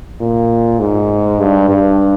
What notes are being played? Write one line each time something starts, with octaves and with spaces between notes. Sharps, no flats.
A#2
G#2
G2
G2